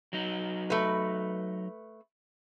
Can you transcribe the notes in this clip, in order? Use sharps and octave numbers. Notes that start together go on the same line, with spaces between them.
F#3 D#4
A3 B4